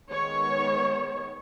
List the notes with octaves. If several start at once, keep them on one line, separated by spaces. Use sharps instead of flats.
D#3 G#3 B3 C#5